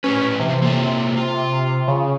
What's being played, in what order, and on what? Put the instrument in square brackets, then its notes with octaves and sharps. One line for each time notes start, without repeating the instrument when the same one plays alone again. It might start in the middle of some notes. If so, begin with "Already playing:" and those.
[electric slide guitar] A2 G4 B4 [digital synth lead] C#4
[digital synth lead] C3 [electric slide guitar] E3 F3
[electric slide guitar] A#3 F4 A4
F4
[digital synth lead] C#3